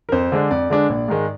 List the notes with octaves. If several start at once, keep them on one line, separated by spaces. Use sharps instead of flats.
A#4
F2 C5
D3 G#3 D4
F2 D5
D3 G#3 D4
A#1
G#2 D#3 G#3